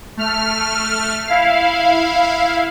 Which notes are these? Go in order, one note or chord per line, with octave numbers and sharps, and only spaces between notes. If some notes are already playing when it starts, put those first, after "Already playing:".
A3 F6
E4 F5